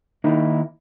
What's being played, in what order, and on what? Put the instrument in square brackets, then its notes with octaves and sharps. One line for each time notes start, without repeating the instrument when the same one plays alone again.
[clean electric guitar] D#3 A#3 D#4 E4